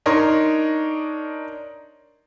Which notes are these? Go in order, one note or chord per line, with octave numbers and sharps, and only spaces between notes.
D4 D#4 A#4 C#5 C6